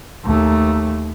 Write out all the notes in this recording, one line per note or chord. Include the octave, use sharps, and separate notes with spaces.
D#2 A3